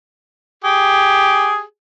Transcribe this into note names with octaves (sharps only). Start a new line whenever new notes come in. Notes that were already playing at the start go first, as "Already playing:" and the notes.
G4 G#4